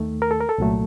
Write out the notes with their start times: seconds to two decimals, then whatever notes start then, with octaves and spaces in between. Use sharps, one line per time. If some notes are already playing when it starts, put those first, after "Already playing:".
Already playing: D#2 D#3 A3
0.22 A#4
0.31 A4
0.40 A#4
0.49 A4
0.58 C2 A#2 F#3 A3